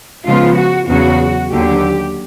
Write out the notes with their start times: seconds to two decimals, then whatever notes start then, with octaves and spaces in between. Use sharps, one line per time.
0.26 C#3 F3 G#3 B3 F4
0.56 F#4
0.88 E2 C#3 F#3 F#4
1.51 D#2 D3 F#3 G4